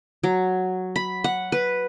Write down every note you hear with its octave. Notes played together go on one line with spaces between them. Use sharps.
F#3
B5
F#5
B4